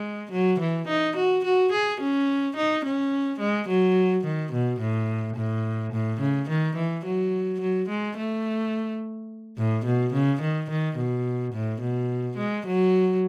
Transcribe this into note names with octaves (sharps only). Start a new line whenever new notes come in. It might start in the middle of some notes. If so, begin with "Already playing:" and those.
Already playing: G#3
F#3
E3
D#4
F#4
F#4
G#4
C#4
D#4
C#4
G#3
F#3
D#3
B2
A2
A2
A2
C#3
D#3
E3
F#3
F#3
G#3
A3
A2
B2
C#3
D#3
D#3
B2
A2
B2
G#3
F#3